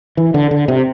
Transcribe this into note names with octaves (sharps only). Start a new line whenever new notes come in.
E3
D3
D3
C3